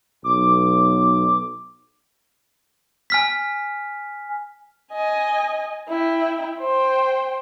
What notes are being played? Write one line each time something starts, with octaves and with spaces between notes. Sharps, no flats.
B1 D6
G#5 F6 B6
D#5 G#5
E4 G5
C5 G5